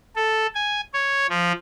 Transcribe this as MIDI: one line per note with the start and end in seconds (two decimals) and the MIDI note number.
0.16 0.47 69
0.55 0.81 80
0.94 1.27 73
1.30 1.52 53